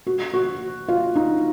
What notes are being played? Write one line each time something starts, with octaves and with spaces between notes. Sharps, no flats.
F#4
F#4
F4
D#4